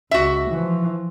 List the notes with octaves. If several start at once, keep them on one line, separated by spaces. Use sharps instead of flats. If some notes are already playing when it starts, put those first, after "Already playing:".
C#2 F#4 E5
E3 F3